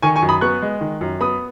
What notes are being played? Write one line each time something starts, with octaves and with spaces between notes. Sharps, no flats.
D#3 G#5 C#6
G#5 C#6
F#2
B5 D#6
B3 C#6 F#6
G#3
D#3
F#2
B3 B5 D#6